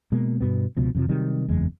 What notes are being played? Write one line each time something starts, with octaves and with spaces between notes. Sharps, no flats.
B2 G#3 A#3
G2 B2 B3
C#2 B2 F3
F2 C3 F3
C3 D#3 F#3 G3
F#1 E2 G#3